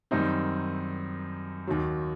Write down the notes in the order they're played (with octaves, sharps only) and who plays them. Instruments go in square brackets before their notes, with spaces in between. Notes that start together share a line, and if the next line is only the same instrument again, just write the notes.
[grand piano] F#2 D#3 G3 C4 D#4
D#2 D#3 F#3